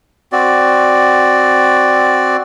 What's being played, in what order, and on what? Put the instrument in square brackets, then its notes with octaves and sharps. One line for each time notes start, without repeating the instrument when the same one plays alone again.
[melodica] C4 F#4 D5